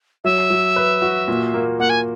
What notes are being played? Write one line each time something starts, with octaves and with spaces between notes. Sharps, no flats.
F#3 E5
F#3
B4
F#4
A#2
A#3
A#3 F#5
G#5